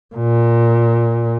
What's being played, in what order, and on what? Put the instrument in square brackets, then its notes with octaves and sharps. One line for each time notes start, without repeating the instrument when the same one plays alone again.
[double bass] A#2